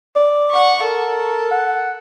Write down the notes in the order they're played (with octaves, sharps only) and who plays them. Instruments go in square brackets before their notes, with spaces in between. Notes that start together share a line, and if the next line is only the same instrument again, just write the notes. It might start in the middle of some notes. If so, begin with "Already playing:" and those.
[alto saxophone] D5
[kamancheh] F#5 C#6
[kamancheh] A4 [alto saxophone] A#4
[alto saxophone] F#5